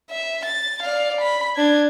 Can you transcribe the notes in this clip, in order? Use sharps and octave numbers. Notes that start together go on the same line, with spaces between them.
E5
A6
D5 F5
B5
D4 G#6